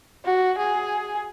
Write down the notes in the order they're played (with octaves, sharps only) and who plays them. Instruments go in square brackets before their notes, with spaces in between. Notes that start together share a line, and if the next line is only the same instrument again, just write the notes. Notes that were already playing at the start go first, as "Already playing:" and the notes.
[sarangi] F#4
G#4